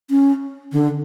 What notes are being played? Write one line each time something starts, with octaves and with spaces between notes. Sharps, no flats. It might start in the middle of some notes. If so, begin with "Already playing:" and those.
C#4
D3